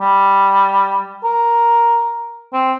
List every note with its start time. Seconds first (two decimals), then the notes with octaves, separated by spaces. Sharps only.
0.01 G3
1.24 A#4
2.53 C4